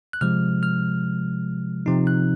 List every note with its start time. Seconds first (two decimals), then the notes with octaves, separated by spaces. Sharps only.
0.13 F#6
0.21 C3 F3 G#3 F6
0.63 F6
1.86 C3 F3 C4 D#4
2.07 F#6